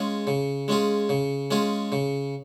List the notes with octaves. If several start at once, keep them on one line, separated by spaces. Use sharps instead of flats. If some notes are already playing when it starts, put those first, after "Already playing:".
Already playing: G#3 C#4 F4 G#4
C#3
G#3 C#4 F4 G#4
C#3
G#3 C#4 F4 G#4
C#3